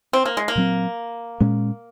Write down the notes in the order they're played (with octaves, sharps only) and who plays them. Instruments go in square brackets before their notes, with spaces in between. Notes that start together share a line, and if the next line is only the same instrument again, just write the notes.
[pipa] C4
A#3
G#3
A#3
[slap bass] A#2 F#3 C4
A#2 G#3 C#4